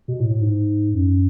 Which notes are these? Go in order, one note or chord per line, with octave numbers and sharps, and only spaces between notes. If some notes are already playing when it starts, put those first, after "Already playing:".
B2
A2
A2
G#2
F#2